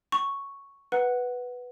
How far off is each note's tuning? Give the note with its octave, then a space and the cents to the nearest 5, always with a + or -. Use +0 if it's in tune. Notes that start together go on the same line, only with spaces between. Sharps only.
G5 -35 C#6 +0
B4 +0 F#5 +0